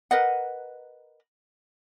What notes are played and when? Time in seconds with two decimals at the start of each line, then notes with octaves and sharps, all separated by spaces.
0.11 A#4 B4 D#5 F#5